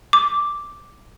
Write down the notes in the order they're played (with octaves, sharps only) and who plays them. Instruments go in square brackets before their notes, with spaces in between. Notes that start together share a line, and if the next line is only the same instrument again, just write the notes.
[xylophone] D6